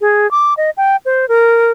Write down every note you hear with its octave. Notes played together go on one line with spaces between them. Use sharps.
G#4
D6
D#5
G5
C5
A#4